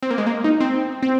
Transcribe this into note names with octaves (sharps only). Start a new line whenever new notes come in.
C4
A#3
G#3
A#3
D#4
C4
C4